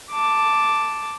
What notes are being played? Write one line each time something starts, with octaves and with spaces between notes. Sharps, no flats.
A5 D6